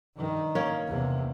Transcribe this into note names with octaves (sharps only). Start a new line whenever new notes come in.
G2 D#3
A#3 C#4
E2 C3